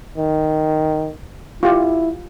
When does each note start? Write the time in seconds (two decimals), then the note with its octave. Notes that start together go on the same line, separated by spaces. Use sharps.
0.18 D#3
1.63 E4 F4 G4